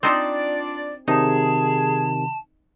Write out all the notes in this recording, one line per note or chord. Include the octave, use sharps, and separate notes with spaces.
C4 D4 D#4 F4 C5 D5
C3 D#3 D#4 G#4 A5